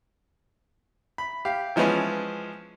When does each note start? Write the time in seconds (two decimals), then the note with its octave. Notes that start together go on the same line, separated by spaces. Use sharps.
1.18 B5
1.45 G4 F5
1.76 E3 F3 G#3 B3 C#4 B4